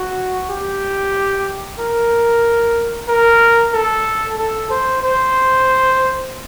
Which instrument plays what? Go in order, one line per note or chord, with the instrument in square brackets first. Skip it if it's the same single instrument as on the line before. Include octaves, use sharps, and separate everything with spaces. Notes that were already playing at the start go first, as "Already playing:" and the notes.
Already playing: [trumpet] F#4
G4
A#4
A#4
A4
A4
C5
C5